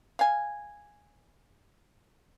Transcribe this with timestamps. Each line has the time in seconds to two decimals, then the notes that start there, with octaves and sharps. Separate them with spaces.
0.19 F5 G#5